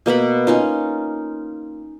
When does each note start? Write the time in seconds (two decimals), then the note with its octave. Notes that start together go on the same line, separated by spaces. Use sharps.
0.06 B2 A#3 F#5 B5
0.47 C#4 D#4 F4